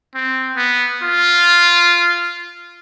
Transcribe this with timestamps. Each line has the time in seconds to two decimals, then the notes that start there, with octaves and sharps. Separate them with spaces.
0.15 C4
0.56 B3
1.02 F4